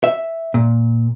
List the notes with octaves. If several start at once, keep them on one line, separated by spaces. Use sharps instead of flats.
E5
A#2